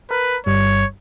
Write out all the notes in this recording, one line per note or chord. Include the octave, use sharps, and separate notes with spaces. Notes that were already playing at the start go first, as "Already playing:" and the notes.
A#4 B4
G1 G2 G3 C#5